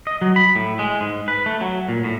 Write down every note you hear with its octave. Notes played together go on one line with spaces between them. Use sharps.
D#5
F#3
B5
A2
G#3
G#2
B4
A3
F#3
A#2
A2